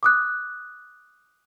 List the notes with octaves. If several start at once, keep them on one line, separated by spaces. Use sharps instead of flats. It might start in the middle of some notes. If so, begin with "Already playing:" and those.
D6 D#6 F#6